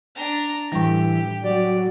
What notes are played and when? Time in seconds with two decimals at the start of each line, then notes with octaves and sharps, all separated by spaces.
0.15 D4 A#5
0.72 A2 E3 G3 G4
1.44 F#3 D5